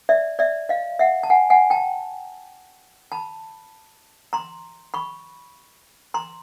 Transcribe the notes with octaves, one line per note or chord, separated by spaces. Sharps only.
D5 E5
D5 E5
D#5 F5
E5 F#5
A5
F#5 G#5
F#5 G#5
G5 A5
A5 B5
A#5 C6
B5 C#6
A#5 C6